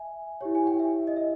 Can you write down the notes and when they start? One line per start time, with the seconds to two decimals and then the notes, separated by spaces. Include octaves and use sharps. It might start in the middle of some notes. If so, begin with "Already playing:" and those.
Already playing: E5 G#5
0.41 E4 G4 C#5
0.55 G#5
0.67 G5
0.80 E5
1.07 D#5
1.16 E5